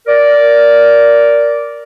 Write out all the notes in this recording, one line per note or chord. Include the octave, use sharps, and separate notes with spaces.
A#4 D5